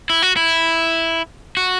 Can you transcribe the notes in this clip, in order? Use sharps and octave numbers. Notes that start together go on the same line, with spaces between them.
E4
F#4
E4
F#4